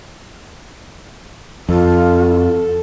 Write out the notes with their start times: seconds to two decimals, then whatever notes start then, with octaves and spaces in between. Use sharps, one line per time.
1.69 F2 F4 A4